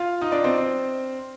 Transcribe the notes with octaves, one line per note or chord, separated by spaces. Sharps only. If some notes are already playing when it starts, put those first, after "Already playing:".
Already playing: F4 F5
D#4 D#5
D4 D5
C4 C5